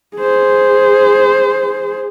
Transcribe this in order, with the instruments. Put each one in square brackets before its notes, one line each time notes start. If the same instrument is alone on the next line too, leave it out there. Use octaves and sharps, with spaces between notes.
[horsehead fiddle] G#4 C5